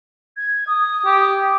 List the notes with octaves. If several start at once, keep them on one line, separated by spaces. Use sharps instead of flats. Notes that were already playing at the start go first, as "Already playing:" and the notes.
G#6
D#6
G4